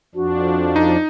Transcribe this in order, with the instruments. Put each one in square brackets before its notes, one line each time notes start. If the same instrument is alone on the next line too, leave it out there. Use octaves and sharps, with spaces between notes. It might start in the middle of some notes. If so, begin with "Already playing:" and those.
[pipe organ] F2 F3 D4 [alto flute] F#4
[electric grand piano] D#4